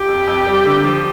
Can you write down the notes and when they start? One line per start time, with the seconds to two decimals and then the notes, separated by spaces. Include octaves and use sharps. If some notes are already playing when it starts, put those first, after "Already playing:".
Already playing: G4
0.08 F2
0.27 F2
0.46 G3
0.65 D3
0.84 F3